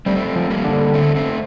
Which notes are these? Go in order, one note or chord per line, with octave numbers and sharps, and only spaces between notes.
G3 A3 C4
F3
G3 A#3
D3
A3 C4
A3 C4